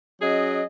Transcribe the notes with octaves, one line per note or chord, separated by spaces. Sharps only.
F#3 C#4 G#4 D#5